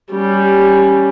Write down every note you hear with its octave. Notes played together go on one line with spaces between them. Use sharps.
G3 C#4